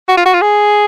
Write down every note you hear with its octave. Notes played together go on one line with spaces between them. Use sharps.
F#4
F4
F#4
F4
G#4